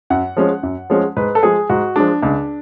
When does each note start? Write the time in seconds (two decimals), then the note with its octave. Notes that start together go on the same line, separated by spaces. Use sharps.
0.10 F#2 F#5
0.37 F3 G#3 C#4
0.63 F#2
0.90 F3 G#3 C#4
1.17 G#2 B4
1.35 A4
1.43 F3 G#3 G#4
1.70 G#2 F#4
1.96 F3 G#3 D4
2.22 C#2 D4